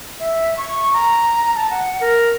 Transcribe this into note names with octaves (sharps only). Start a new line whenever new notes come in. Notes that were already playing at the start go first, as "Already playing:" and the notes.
E5
C#6
A#5
A5
F#5
A#4